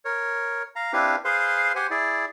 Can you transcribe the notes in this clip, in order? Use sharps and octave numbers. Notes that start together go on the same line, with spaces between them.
A#4 C#5
F5 A#5
C4 D4 E4 G4 B4 F5
G#4 B4 C5 F5 C6
G4 C5 F#5 G#5
E4 G#4 D5